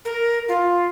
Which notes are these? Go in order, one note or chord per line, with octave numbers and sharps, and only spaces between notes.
A#4
F4